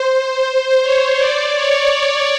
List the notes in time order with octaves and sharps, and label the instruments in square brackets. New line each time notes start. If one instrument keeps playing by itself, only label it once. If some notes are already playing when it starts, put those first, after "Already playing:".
Already playing: [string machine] C5
C#5
D5
C#5